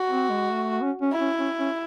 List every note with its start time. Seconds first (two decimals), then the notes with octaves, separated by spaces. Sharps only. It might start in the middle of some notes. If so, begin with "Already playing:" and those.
Already playing: F#4
0.08 C4
0.30 G#3
0.51 A3
0.81 C#4
1.01 C#4
1.12 E4
1.20 C#4
1.39 C#4
1.60 C#4